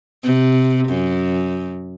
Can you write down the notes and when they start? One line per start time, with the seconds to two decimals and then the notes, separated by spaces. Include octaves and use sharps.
0.23 C3
0.88 F#2